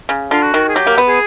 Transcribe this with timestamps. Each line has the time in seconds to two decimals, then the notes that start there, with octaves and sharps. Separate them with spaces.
0.09 C#3
0.31 D3 F4
0.42 F#4
0.54 D#3
0.69 G#4
0.75 F#3 G4
0.87 A#3
0.98 B3
1.08 G#4